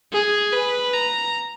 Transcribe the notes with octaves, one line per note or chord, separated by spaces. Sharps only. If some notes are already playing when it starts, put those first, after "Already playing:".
G#4
B4
A#5